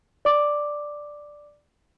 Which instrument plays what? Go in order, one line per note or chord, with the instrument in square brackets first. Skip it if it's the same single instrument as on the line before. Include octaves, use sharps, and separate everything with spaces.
[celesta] D5 D6